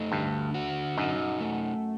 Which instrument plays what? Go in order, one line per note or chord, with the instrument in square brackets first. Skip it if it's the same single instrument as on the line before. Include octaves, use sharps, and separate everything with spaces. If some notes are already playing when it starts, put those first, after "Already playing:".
Already playing: [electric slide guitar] A3 D#4
[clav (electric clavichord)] G2 [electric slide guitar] D3
[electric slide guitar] F#4
[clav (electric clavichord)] F#2 [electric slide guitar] D#4
[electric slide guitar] A3